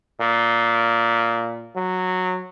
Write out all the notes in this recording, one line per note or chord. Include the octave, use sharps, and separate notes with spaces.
A#2
F#3